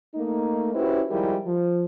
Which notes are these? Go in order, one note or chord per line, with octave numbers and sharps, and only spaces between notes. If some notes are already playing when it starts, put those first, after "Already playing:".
A3 A#3 D#4
C#4 E4 F#4 G4 B4 C5
D#3 F3 G3 G#3 E4 A#4
F3